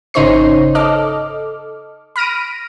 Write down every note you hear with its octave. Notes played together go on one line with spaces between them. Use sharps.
G#1 C#3 D#4 C5 C#5 C7
A4 D#5 D6 F6
B5 F6 A#6 D7 D#7